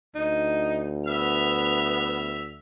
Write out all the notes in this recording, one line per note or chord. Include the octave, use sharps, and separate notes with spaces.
D2 D#4
B3 E5 F6